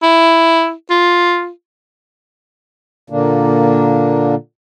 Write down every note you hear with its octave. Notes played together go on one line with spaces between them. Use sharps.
E4
F4
A#2 D3 A#3 D4